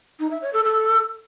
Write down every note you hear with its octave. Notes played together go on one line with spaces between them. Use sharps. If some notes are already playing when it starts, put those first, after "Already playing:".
D#4
E5
C#5
A4
A4